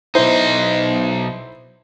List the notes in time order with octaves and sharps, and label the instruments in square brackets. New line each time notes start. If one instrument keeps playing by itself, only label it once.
[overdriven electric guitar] B1 D#4 [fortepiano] E4 C5